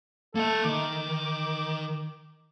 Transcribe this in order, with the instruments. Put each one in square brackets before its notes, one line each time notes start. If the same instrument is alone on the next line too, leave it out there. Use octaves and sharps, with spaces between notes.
[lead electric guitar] A#3 E5 [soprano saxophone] A4
[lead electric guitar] D#3 [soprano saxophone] D6